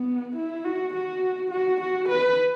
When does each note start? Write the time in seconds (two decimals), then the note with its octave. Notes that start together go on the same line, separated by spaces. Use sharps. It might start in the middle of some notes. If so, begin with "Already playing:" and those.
Already playing: B3
0.36 E4
0.64 F#4
0.93 F#4
1.51 F#4
1.80 F#4
2.08 B4